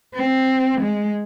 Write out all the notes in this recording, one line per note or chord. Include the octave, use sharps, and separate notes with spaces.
C4
G#3